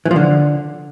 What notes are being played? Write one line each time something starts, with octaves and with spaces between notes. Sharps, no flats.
E3
F3
D3